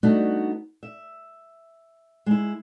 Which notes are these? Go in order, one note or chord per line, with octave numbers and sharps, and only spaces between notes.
G3 A3 B3 D4 D#4 F#4
E5
G#3 E4